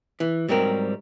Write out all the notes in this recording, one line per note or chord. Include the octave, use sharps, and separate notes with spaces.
E3
G#2 F#3 G3 C4 A#4